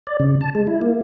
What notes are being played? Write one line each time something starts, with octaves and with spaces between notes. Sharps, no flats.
D5
C#3
A5
G#3
E4
A#3